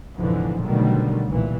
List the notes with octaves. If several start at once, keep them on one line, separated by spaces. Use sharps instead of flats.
C#2 G#2 B2 D3 E3 F3
B2 D3 D#3 F#3 G3 A3
C2 A#2 E3